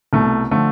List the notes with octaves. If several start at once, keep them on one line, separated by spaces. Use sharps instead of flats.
C2 B2 A3
D3 F3 A3